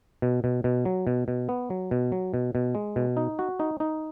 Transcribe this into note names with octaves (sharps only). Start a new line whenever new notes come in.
B2
B2
B2
F#3
B2
B2
B3
F#3
B2
F#3
B2
B2
G#3
B2
D#4
F#4
D#4
D#4